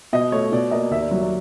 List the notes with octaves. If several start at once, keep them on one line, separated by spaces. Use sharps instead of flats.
B2 D#5
A3 C#5
B2 D5
A#3 D#5
D#2 E5
D5
F#3 C#5
D5